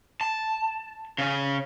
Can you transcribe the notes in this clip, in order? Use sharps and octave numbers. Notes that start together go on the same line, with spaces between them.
A5
C#3 C#4